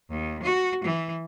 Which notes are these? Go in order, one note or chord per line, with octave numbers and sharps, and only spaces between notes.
D#2
F#4
E3